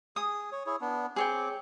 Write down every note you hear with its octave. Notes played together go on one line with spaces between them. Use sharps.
G#4 D#6
C#5
E4 G#4 C#5
B3 D4
C4 G#4 C#5 G5 D6